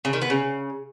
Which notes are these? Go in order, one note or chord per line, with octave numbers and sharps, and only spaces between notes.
C#3
D#3
B3
C#3